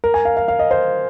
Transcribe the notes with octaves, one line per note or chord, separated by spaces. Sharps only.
A#4
G#5
F5
F5
F5
D#5
C5